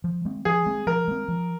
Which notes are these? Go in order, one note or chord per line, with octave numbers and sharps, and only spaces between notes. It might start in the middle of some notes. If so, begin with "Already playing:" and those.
F3
G#3 C4
F3 G#4
G#3 C4
F3 A#4
G#3 C4
F3